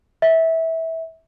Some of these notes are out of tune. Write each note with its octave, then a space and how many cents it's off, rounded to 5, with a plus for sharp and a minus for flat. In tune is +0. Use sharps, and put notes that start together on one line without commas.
E5 -20